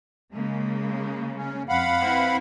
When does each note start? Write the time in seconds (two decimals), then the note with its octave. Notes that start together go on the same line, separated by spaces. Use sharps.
0.32 C#3 G#3 A#3
1.36 C#4
1.69 F2 F5 F#5 B5
2.01 C4 E4 B4